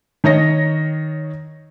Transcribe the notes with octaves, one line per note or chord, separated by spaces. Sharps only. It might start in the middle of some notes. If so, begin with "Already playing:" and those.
D#3 C#5 D#5 A#6